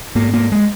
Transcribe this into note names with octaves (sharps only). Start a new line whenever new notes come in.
G#2 A#3
A#3
G#3